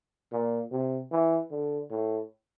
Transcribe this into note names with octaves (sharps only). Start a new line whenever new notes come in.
A#2
C3
E3
D3
A2